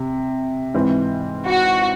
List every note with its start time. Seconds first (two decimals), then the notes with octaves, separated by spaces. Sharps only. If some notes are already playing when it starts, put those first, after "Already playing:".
Already playing: C3
0.74 G#2 E3 C4
1.46 F#4